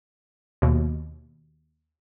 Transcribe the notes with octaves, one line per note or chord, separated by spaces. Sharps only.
D#2 B2